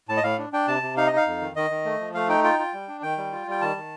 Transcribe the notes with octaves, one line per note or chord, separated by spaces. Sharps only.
A2 A5
D#5
A2 F5
D4
D4 G5
C3 A5
C3
D#4 F5
D#5
D#4 F5
F2
D#3
D#3 D#5
D#3
A3
F3
A3 F5
D#4 G5
F4 G5
F4
G3
D4
D#3 G5
G3
F4
G3 G5
D#3 A5
D#3